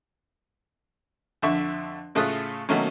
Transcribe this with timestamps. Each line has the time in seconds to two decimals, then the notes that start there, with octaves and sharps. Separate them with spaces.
1.42 F2 D3 E5 C#6
2.15 A2 C#3 A3 F4 D#6 F#6
2.69 B2 D#3 F#3 A3 A#3 C#4